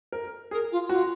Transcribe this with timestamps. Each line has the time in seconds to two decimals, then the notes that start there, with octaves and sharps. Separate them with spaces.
0.12 A#4
0.51 G#4 A#4
0.71 F4
0.89 F4 F#4